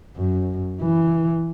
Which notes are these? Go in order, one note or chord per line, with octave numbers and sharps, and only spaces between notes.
F#2
E3